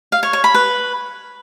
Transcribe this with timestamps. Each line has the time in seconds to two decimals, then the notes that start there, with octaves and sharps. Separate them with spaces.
0.12 F5
0.23 C#5
0.33 C#5
0.44 B5
0.54 B4